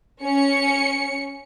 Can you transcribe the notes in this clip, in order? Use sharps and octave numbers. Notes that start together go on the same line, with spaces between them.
C#4 C#7